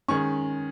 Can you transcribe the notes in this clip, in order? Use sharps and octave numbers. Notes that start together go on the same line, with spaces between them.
D#3 G#3 C#4 C#6